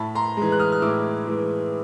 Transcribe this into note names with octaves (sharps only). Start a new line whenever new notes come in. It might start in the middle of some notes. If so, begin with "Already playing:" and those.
Already playing: A2 A5 B5
A#5 C6
E3 G#3
F#6
D#6 F6
F6
A2 D6 E6
E3 G#3